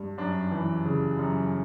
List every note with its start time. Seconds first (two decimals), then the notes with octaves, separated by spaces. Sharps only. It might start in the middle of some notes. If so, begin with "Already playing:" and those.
Already playing: G2
0.18 F#2 D4
0.51 E3
0.85 C#3
1.19 F#2